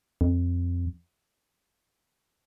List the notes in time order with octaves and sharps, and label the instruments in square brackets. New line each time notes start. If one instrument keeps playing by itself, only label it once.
[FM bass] F2